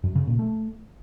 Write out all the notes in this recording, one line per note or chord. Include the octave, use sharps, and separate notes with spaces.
F#2
C#3
A#2
A3